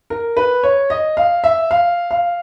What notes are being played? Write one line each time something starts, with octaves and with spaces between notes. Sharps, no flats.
A#4
B4
C#5
D#5
F5
E5
F5
F5